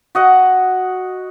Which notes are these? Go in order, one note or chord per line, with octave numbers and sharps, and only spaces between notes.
F#4 D#5 F#5